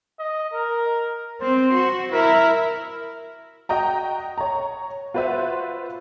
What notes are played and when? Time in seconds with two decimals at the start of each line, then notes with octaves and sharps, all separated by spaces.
0.19 D#5
0.53 A#4
1.41 C4 C5
1.74 F#4
2.13 E4 A#4 E5
3.69 F#4 D#5 G5 A#5
4.38 C#5 A#5
5.14 F4 F#4 B4 C5 E5 F#5